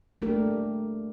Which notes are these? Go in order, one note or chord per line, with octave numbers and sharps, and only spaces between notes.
A3 A#3 D4 G4 A#4